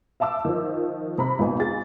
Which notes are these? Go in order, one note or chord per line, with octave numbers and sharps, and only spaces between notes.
E5 F5 A5 D6 E6
D#3 F3
C3 A#5 B5
G#1 A#2 B3 D#4 G#5
F4 G#4 A6